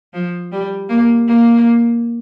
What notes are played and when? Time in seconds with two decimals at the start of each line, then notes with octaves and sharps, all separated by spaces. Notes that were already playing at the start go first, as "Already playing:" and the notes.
0.14 F3
0.52 G3
0.89 A#3
1.28 A#3